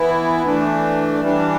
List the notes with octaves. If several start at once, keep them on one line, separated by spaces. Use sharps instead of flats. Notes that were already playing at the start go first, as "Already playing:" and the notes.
Already playing: E3 B3 E4
E3 A3 D4
E3 G3 D4